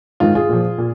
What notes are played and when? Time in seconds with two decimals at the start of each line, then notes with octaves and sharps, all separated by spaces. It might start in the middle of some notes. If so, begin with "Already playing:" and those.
0.20 G#2 D#3 F4
0.35 F4 G#4
0.49 A#2 F3
0.78 A#2